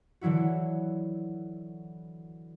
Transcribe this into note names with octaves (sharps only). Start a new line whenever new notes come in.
D3 E3 F#3 E4 F#4